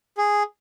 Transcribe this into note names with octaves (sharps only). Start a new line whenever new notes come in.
G#4